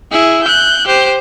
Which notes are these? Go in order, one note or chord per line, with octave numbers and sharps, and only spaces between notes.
E4 G#4
F#6 G6
G4 C5